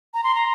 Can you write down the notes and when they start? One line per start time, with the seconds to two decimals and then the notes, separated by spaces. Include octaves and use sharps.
0.14 A#5
0.24 C6
0.35 A#5